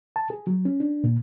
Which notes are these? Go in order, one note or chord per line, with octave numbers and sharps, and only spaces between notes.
A5
G#4
F#3
C#4
D4
A#2